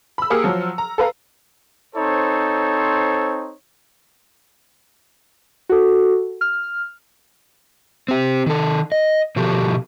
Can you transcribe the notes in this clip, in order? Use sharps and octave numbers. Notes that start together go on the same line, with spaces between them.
B5 E6
A#3 G4 G#4 D#6 F6 C#7
F3 F#3
A#5
A4 B4 F5 A#5
C4 D#4 A4 C5 C#5
F#4 A4
F6
C4 G4
D#3 A4
D#5
B2 F3 F#4 G4 A4